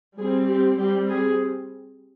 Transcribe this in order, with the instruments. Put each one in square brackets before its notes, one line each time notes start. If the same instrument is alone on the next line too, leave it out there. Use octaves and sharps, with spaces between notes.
[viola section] G3 C4 G#4
G4
G3 C4 G4
G#4